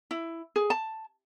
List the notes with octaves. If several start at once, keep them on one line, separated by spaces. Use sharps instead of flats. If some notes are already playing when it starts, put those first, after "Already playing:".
E4
G#4
A5